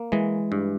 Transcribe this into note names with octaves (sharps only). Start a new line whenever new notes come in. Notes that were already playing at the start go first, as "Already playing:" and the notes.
Already playing: A#3
E3 G#3
G2